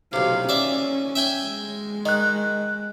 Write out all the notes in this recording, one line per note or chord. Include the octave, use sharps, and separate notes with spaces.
B1 C3 F5
C#4 D5 E5
E5 G5 G#5
G#3
D#3 D#5 F#6